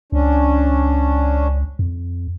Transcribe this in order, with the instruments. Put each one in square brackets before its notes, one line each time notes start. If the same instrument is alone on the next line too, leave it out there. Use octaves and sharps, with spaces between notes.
[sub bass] C#2 [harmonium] C#4 D4
[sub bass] F2